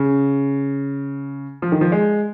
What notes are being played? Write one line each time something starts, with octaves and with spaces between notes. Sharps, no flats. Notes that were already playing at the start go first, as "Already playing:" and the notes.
Already playing: C#3
F3
D#3
F3
G#3